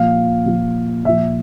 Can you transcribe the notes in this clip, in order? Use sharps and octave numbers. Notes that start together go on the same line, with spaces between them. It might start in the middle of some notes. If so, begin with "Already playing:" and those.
Already playing: A#2 F3 F5
A#2 F3
A#2 F3 E5